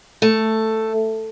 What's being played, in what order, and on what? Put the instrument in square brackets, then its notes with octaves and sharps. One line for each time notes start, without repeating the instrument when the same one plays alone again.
[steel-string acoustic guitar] A3